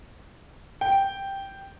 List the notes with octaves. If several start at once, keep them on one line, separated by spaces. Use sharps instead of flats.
G5